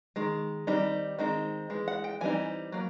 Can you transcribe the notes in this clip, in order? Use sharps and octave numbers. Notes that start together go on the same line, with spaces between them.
D#3 G#3
D#3 G3 C4 D#4
D#3 G#3 C4 D#4
E3 G#3
F#5
G5
E3 G3 C4 D#4 G#5
F#3 A#3